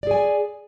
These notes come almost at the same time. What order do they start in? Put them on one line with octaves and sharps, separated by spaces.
D5 G#4 G#5